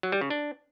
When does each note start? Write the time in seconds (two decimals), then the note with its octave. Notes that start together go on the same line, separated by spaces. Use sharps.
0.03 F#3
0.12 G3
0.21 C#3
0.30 D4